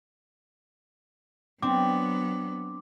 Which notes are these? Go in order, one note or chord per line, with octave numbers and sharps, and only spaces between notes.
F#3 B3 C4 D4 D6